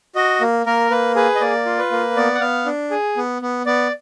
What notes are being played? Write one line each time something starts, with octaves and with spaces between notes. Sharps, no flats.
F#4 D#5
A#3
A#3 A#4
A#3 B4
G#4 B4
D#5
A#3 D5
F4
B4
A#3
B3 D5
F#5
B3 F5
D4
G#4
B3
B3
B3 D5